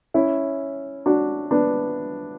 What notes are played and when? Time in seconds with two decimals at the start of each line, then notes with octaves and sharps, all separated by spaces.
0.14 C#4 E4
1.06 D4 F#4
1.51 B3 D4